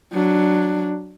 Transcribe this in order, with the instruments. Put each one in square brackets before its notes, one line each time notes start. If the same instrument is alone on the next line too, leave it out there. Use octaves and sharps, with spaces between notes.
[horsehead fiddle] F#3 D4